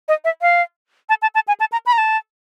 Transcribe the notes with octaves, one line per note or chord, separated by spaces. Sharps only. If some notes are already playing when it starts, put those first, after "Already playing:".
D#5
E5
F5
A5
A5
A5
G#5
A5
A#5
B5
A#5
A5